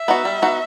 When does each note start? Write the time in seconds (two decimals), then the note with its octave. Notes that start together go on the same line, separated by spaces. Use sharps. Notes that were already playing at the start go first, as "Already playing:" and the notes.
Already playing: E5
0.08 B3 D#4 F#4
0.25 G3
0.42 B3 D#4 F#4